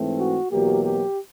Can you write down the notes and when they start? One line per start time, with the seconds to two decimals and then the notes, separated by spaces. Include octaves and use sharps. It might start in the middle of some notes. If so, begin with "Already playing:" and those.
Already playing: G#2 E3 A3 C4
0.17 F#4
0.50 E2 B2 F#3 A#3 G4
0.83 G4